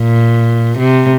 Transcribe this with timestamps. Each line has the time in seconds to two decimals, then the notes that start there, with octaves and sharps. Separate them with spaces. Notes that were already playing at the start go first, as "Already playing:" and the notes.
Already playing: A#2
0.78 C3